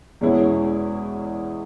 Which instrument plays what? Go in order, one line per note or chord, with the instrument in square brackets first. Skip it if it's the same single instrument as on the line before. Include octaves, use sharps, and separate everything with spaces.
[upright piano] E2 B2 G#3 C#4 E4